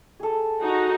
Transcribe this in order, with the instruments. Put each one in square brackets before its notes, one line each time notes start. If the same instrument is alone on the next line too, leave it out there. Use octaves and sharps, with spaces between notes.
[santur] G#4 A4
[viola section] D#4 F#4